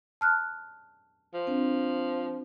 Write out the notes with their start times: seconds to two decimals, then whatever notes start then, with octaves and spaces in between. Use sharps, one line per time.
0.21 A5 F6 F#6
1.34 F3
1.47 C4 D4